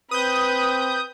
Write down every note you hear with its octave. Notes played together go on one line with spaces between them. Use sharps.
C4 B4 D#6 G6